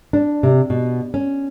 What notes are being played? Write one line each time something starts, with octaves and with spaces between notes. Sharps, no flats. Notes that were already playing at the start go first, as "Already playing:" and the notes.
D4
C3
B2
C#4